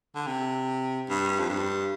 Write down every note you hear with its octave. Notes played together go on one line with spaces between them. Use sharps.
D3
C3
G2
F2
G2